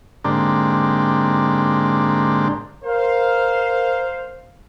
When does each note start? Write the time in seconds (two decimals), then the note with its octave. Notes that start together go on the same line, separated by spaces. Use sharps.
0.24 G#2 D3 A#3 C4 D4 G4
2.85 A#4 C5 F5